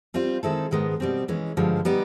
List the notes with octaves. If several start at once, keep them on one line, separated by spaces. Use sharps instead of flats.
G3 C4 F4
D#3 G#3 C4 E4 A4
G#2 D#3 G#3 B3
B2 G3 C4
E3 G#3 C#4
G2 D3 F3 G#3
G3 B3 D#4 G4